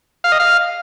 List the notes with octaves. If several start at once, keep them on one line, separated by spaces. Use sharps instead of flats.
F5
D#5
F5